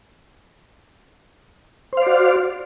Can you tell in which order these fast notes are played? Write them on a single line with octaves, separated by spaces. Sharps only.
C5 F5 D5 F#4